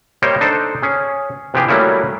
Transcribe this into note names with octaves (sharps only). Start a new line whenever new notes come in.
G3 A#3 C5 C#5 D#5 G5
D4 D#4 A4 C5
C#4 G#4
C3 E3 F3 G4 G#4
F#3 G3 A3 A#3 C#4 E4